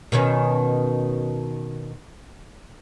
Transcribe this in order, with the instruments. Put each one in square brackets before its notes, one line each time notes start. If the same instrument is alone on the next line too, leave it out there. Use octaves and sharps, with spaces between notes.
[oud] B2 D#3 C#4